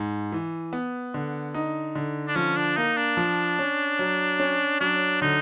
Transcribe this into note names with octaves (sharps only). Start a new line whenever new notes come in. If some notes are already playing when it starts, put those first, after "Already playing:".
Already playing: G#2
E3
B3
D3
D#4
D3
D4
F3 C#4
D4
A#3 D#4
D4
F3
C#4
F#3
C#4
F#3 D4
D3 D#4